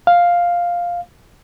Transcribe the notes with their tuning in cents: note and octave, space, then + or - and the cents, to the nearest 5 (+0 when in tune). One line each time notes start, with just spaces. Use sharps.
F5 +5